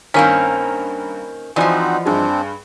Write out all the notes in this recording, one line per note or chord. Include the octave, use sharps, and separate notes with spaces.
G2 D#3 A#3 C4 C#4 A#5 B6
E3 F3 G#3 C4 D#4 F#4 D5 F#5
G2 C4 D4 G#4